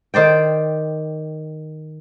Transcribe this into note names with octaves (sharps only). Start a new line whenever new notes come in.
D#3 C5 D5 G5